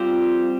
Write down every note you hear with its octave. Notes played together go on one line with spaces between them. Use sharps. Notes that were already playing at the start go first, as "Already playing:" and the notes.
Already playing: G3 C4 F4 G4 C5